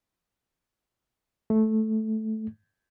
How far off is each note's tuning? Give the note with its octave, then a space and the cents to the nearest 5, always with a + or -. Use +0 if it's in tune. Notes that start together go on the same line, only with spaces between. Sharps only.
A3 -10